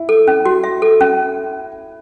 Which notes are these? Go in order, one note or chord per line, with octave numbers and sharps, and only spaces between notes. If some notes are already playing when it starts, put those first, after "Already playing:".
Already playing: E4
A4
C#4
F#4
E5
A4
C#4